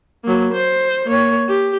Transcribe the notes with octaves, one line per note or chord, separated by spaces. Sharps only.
F#3 A#3
C5
A#3 C#5
G4